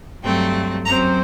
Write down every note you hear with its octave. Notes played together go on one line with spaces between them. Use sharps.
G2 F#3 A3 C4 G5
F#2 F#3 C4 A#5